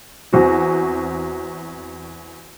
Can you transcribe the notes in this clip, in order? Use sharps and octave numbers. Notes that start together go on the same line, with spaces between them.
E2 C4 F#4